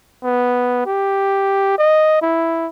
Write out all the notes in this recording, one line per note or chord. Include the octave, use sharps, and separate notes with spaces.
B3
G4
D#5
E4